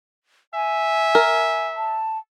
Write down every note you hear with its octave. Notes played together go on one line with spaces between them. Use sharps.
E5 G#5
A#4
A5